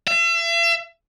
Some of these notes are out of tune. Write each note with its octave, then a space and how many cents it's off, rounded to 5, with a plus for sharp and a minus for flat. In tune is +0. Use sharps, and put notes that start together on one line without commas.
E5 +40